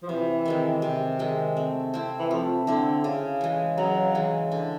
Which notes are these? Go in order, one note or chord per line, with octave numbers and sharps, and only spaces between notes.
F3
C3 E3
D#3 G#3 C4
C3
D#3 G#3 C4
A3
C4 E4
E3
F3 A3
D3 C4 E4
C#3
E3 G#3
C#3 F#3
E3 G#3
D3